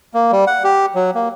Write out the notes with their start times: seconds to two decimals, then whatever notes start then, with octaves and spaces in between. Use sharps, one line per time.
0.14 A#3
0.32 G3
0.47 F#5
0.64 G4
0.95 F#3
1.15 A#3